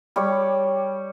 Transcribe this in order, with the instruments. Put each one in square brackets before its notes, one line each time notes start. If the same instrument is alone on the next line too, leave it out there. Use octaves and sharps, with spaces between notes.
[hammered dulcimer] G3 C#5 C#6 D6